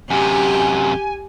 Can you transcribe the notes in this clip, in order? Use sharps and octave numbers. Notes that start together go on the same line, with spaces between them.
F#2 C3 G4 G#5